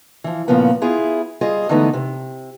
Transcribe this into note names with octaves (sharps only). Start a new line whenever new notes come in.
E3 F3
A#2 C#3 F3 A#3 B3
B3 E4 F4 G#4
G3 F4 G#4 D#5
D3 E3 G#3 A3 B3 D#4
C3